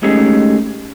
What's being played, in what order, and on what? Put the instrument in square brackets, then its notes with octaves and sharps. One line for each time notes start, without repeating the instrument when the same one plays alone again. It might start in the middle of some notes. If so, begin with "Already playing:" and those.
[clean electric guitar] G#3 A3 C#4 D#4 G4 G#4